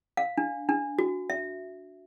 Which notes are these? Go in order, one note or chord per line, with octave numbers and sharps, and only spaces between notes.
F5
D4
D4
F#4
E5